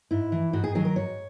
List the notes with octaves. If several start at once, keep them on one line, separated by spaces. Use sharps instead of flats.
G#2 E4
E3
G#2 F#4
G#4
D#3 F#3 G#4
A#4
G#2 C#5